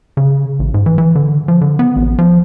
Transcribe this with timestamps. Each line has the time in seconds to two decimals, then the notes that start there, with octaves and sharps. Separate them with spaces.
0.17 C#3
0.59 A1
0.74 G#2
0.86 E3
0.98 E3
1.15 D3
1.48 F3
1.61 D3
1.79 B3
1.96 A1
2.19 F3